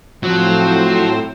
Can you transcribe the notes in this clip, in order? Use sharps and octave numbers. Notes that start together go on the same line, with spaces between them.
A2 F3 F#3 C4 C5